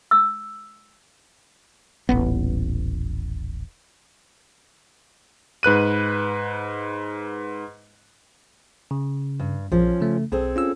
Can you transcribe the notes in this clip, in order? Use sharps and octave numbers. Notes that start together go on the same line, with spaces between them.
E6
D#1 A1 B3
G#2 B4 F#6 D#7
C#3
G2
A#1 F3 C#4
C#3 A3
B1 C4 G#4 A4
C#4 F4 E6